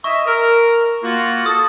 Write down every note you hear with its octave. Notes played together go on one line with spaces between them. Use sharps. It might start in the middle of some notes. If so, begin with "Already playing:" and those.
D#5 E5 C#6
A#4
A#3 F4 F#4
A4 D#6